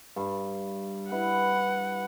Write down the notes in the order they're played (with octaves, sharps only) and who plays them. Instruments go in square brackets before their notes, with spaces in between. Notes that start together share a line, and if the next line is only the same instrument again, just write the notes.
[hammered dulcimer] G2 A5 A#5
[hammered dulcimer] E4 B4 [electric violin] F#5